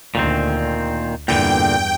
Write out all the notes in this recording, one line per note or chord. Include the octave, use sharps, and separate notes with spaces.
D2 A#2 D#3 C4
E2 G2 A#2 D3 E3 G5